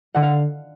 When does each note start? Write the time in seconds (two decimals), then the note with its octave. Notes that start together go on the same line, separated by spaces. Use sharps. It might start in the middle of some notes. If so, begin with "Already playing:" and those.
0.14 D3 F#5
0.22 F5